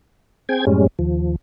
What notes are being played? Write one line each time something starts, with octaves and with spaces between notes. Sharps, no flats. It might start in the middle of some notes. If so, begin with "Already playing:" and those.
C4 G#4 G5 G#6
F#2 A2 G3 G#3 C#4
D#2 F3